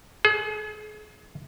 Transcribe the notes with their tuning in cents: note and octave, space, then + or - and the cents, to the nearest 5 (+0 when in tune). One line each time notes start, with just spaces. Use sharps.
G#4 +35